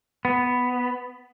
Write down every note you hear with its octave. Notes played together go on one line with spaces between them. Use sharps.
B3